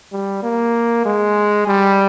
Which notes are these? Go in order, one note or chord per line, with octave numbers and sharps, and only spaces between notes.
G3
A#3
G#3
G3